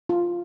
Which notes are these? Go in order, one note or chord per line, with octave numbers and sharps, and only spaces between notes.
F4